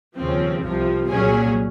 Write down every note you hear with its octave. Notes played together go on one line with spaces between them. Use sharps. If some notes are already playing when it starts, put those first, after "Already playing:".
D#2 C#3 F3 C4
C2 C3 F3
C2 A#2 F#3 C#4 G#4